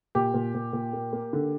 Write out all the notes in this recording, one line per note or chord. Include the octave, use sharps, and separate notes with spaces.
A#2 G4
A#2
A#2
A#2
A#3
A#3
D3